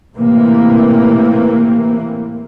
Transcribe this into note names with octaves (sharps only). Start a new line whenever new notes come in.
A2 C3 E3 A#3